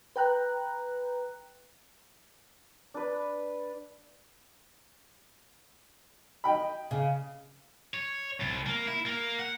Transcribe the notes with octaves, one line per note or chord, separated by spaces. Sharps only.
B4 G5 A#5 F#6
D4 B4
D#5 G5 B5
C#3
C#5
C2
A#3
E4
A#3
F#5